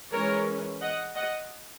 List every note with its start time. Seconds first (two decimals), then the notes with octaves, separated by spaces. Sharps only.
0.12 E3 G#3 C#4 A#4 C#5
0.81 D#5 F#5
1.15 D#5 F#5